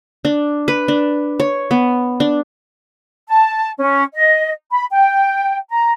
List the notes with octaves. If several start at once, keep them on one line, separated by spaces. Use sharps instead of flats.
D4
B4
D4
C#5
B3
D4
A5
C#4
D#5
B5
G5
A#5